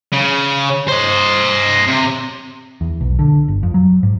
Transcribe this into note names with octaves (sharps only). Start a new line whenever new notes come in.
C#3
C5 D#5
C3
E2
B1
D3
G1
F2
F#3
G#2